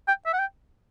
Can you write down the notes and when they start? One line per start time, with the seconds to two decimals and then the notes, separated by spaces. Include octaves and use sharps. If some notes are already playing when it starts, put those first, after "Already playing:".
0.08 G5
0.26 E5
0.33 F#5
0.39 G5